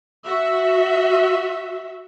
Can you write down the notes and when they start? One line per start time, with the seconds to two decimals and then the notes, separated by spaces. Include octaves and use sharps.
0.25 F#4 E5